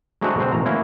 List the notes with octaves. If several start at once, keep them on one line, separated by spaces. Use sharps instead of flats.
F#3 G#3 A3 C4 D4 F#4
B2 C4
A1 A#5
A#3 C#4 E4 F#4